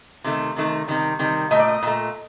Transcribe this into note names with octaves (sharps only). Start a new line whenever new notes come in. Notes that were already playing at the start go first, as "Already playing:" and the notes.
C3 D#3 A3
C3 D#3 A3
C3 D#3 G3
C3 D#3 G3
A#2 A3 D#5
D5
D#5
A#2 A3